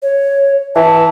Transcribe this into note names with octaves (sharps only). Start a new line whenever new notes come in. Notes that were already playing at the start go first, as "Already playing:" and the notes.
C#5
E3 A5